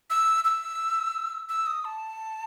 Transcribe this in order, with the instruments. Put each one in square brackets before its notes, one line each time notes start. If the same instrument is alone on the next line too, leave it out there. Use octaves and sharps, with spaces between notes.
[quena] E6
E6
E6
D#6
A5